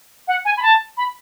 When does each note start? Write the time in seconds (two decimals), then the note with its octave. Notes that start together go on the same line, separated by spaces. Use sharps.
0.28 F#5
0.45 G#5
0.57 B5
0.62 A5
0.97 B5